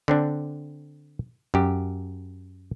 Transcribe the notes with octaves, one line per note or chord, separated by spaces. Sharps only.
D3 C4 D4
F#2 G4